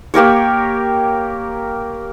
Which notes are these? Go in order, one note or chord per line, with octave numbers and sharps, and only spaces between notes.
A#3 G4 A#4 C#5